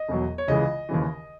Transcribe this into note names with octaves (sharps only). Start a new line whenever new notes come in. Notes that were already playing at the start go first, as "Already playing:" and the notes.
Already playing: D#5
E1 E2 B2 F#3
C#5
C#2 C#3 E3 G#3 D#5
D#2 C#3 E3